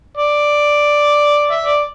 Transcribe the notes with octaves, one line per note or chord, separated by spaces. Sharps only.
D5
E5
D5